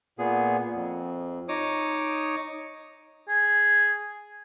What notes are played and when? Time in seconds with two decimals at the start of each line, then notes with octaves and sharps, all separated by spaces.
0.19 A#2 B3 G#4
0.75 F2
1.49 D#4 C#5 D6 D#6
3.29 G#4